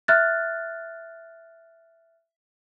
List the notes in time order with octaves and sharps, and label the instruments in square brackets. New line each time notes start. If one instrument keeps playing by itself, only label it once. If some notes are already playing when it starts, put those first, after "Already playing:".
[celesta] E5 F6 F#6 A6